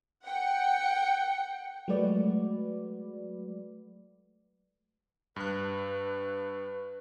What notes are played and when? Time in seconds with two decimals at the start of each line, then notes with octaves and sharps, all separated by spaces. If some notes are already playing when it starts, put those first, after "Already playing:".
0.22 F#5 G5 C#7
1.88 F#3 G#3 A3 F#4 B4 D5
5.36 G2 B4 F#6